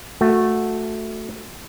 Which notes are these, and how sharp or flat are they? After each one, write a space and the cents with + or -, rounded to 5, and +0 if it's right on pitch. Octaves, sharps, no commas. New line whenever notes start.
A3 +0 F#4 -15